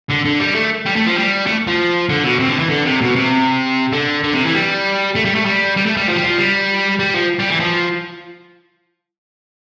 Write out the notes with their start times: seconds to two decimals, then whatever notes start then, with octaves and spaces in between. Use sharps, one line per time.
0.10 D3
0.25 D3
0.40 G3
0.55 A3
0.86 G3
0.96 A3
1.07 F3
1.16 G3
1.47 A3
1.68 F3
2.09 D3
2.24 B2
2.39 C3
2.49 D3
2.59 E3
2.70 D3
2.86 C3
3.01 B2
3.16 C3
3.92 D3
4.23 D3
4.34 C3
4.44 E3
4.54 G3
5.15 A3
5.25 G3
5.35 A3
5.46 G3
5.77 G3
5.86 A3
5.97 G3
6.08 F3
6.16 G3
6.24 F3
6.38 G3
6.99 G3
7.14 F3
7.40 G3
7.50 E3
7.60 F3